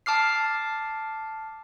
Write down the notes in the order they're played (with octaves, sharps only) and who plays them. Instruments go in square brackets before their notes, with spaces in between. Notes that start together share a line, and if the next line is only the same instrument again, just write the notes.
[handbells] A5 D6 F6 C7